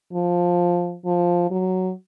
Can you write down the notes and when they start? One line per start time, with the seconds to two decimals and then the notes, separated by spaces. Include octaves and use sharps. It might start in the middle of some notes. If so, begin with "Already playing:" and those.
0.13 F3
1.05 F3
1.51 F#3